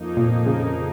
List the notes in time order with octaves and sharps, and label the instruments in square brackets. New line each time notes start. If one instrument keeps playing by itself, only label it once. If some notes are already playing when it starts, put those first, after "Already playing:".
Already playing: [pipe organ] F2 F3 A#3 D#4
[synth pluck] A#2
C#3